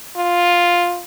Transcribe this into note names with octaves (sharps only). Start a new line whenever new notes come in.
F4